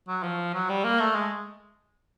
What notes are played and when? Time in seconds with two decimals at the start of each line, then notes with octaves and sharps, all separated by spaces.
0.08 F#3
0.23 F3
0.54 F#3
0.69 G3
0.84 A#3
1.00 A3
1.15 G#3